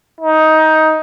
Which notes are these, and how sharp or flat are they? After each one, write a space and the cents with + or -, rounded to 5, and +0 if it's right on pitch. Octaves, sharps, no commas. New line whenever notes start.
D#4 +15